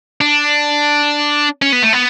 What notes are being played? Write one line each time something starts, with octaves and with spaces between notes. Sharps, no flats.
D4
C#4
B3
A3
B3